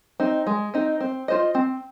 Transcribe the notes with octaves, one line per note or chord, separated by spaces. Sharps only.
C4 D#4
G#3
C4 D#4
C4
F4 C5 D#5
C4